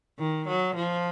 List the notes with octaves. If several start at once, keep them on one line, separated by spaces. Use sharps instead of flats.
D#3
F#3
F3